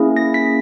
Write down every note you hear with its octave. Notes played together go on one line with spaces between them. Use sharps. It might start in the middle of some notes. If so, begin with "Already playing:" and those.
Already playing: A#3 C#4 E4 G#4
A#6
B6